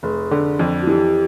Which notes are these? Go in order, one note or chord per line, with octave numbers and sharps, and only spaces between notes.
F1 G#4
D3
F2
F#4
E3 G4